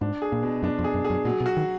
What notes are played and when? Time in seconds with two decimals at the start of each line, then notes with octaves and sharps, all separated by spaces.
0.01 G#2 D4
0.22 G#4
0.32 A#2
0.43 B2
0.62 F#2 D4
0.79 F2
0.84 G#4
0.94 F#2
1.05 G#4
1.10 F#2
1.25 A#2 F#3
1.40 B2
1.46 F#4
1.57 D#3